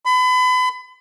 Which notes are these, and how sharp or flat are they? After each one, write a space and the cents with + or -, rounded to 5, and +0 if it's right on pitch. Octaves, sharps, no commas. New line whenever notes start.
B5 +35